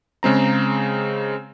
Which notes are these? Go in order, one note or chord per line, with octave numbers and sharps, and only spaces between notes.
C#3 G#3 C4 A#5